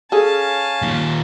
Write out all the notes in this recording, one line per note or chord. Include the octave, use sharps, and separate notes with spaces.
C#4 G#4 A4 F5 G#5 A5
D#2 A#2